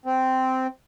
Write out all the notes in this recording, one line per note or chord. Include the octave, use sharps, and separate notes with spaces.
C4